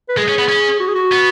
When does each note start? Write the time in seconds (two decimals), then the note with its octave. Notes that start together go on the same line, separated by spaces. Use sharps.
0.09 B4
0.17 G#3 G#4
0.28 C#4
0.39 B3
0.48 C#4
0.80 F#4
0.88 G#4
0.95 F#4
1.12 B3